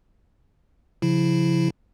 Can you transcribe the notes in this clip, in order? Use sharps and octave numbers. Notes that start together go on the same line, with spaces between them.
C#3 F3 E4